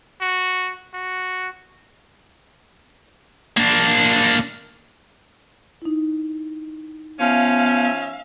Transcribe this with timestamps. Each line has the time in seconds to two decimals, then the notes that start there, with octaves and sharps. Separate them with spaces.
0.21 F#4
0.94 F#4
3.57 A#3 D4
5.82 D#4 E4
7.19 F3 B3 C#4 E5 F5